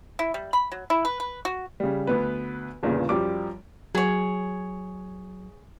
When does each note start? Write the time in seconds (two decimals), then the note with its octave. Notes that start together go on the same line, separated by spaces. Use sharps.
0.19 E4
0.34 G3
0.53 B5
0.72 F#3
0.90 E4
1.05 B4
1.20 B4
1.45 F#4
1.80 C#3 G3
2.07 D2 B3 B4
2.83 G1 E2 G2 A#2 C#3
3.09 F#2 F3 G3 D6
3.95 F#3 G#4 C#5